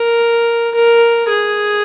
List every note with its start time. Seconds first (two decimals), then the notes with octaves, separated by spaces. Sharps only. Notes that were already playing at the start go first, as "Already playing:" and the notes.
Already playing: A#4
0.75 A#4
1.29 G#4